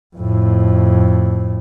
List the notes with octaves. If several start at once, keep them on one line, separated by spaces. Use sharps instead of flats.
F2 A2